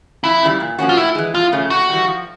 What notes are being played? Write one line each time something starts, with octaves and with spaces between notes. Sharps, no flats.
F2 E4
C#3 E3 G3
A#2
F3 A#3 C#4 F#4
F4
A2 E4
E3 G#3
F2 F4
C#3 F3 A3 C#4
A2 F#4
E3 G3
F3